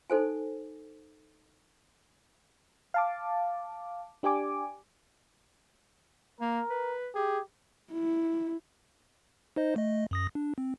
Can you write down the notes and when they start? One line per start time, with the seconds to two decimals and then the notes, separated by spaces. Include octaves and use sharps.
0.10 D#4 A4 C5 G#5
2.94 F5 A5 D6
4.23 D4 G4 D5 G#5 D6
6.41 A#3 A#4
6.70 B4
7.15 G4 G#4
7.93 E4
9.56 D#4 C5 D#5
9.76 A3 D#5
10.11 F#2 D#6 A#6
10.35 D4
10.58 C4